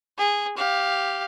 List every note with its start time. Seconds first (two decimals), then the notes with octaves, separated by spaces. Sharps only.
0.18 G#4
0.57 G4 F5